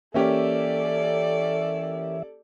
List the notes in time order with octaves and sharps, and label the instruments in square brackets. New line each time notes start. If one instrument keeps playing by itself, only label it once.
[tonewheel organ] E3 E5 [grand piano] A#3 C#4 G4 [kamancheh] A4 D5